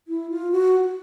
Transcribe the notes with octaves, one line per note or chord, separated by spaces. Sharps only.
E4
F4
F#4